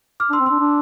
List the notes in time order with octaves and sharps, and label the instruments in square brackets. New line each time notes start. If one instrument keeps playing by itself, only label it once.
[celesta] D6 F6
[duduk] D4
[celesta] C6 E6
[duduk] C4
[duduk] D4 [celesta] C6 E6
[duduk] D4